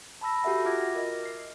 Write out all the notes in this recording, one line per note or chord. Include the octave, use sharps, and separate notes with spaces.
A5 B5 E6 A#6
F#4 G4 A4 E5 F#5
F4 E5 D6 F6 G#6 A#6
A#4 D#5
F6 C7